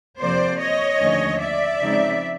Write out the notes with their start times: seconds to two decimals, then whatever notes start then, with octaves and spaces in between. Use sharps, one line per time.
0.21 F2 C3 F3 A#3 C5 D5
0.60 C#5 D#5
1.00 D#2 D3 F3 A3 C#4
1.40 D5 E5
1.80 C#3 F3 G#3 C4 D#4